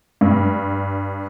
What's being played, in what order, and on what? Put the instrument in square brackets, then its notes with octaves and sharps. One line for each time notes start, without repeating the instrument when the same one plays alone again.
[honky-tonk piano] G2